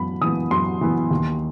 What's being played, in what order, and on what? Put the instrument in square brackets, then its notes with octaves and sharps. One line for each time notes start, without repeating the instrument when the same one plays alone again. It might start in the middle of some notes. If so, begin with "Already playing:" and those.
Already playing: [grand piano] F#2 E3 B3 B5
E3 B3 D#6
F#2 C6
E3 B3
D#2